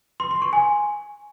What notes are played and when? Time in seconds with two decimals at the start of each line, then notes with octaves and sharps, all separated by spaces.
0.20 C6
0.31 C6
0.42 C#6
0.53 G#5